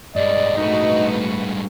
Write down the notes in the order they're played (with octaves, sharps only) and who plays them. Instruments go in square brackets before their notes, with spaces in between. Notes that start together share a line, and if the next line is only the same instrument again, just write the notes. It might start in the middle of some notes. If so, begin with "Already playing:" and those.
[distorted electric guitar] G2 G#3 [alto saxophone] D5 [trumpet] D#5
[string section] A3 F#4 B4 [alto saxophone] D#4